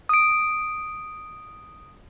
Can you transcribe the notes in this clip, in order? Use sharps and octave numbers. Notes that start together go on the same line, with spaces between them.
D#6 D7